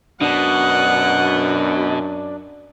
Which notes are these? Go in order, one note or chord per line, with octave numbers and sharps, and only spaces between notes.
F#2 B2 D4 F#5